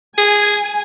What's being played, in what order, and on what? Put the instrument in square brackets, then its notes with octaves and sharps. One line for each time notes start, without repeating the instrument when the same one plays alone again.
[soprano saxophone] G#4 [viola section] G#5